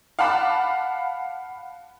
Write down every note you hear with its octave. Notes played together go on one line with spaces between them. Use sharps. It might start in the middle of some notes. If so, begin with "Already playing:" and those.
F5 F#5 A5 B5 D6